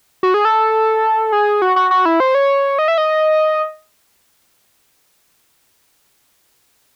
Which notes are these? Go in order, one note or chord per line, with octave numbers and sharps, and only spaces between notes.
F#4
G#4
A4
G#4
F#4
F#4
F#4
E4
C5
C#5
D#5
E5
D#5